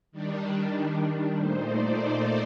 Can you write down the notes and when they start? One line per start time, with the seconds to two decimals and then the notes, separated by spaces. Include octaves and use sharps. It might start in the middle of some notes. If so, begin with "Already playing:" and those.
0.12 D#3 G3 D4
1.36 A#2 A3 D#4 C5
1.66 D5
1.98 D5